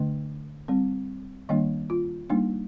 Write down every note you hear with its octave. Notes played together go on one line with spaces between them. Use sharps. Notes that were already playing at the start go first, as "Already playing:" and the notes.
Already playing: D3 A3 D4 D#5
G3 C4
D#3 G3 A#3 D4 D#5
F4
G3 A#3 D4 D#4